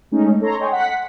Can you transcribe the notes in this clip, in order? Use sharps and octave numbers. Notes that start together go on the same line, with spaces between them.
G#3 A3 C#4 D#4
A4 C#5 A#5 C6
C#5 D#5 G5 G#5 C6 C#6
F#5 B6